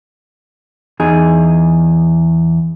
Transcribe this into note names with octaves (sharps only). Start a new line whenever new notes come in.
E2 D#4 G#4